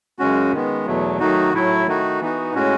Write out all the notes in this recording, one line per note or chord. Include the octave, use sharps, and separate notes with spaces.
F#2 C#3 G#3 C#4 F#4
D#3 G#3 B3
E2 B2 F#3 A3
D#3 F#3 A3 D#4 F#4
A2 F#3 A3 E4
D#3 A3 D#4 F#4
E3 B3 D#4 F#4
A2 G#3 C#4 F#4